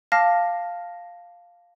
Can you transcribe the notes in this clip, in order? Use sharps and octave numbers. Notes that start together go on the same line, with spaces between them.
F5 A5 D6 F6 A#6